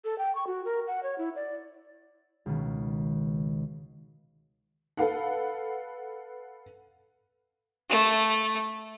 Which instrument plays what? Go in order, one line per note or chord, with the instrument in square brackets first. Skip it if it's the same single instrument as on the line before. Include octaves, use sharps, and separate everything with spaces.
[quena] A4
G5
C#6
F#4
A#4
F#5
C#5
E4
D5
[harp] C#2 B2 D#3
[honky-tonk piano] A4 B4 F5 F#5
[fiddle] A3